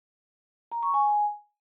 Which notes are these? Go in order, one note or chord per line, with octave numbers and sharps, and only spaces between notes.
A#5
C#6
G#5